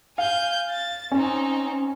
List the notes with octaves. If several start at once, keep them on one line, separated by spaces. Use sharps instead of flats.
F5 G#5 G6
A6
C4 C#4 D#4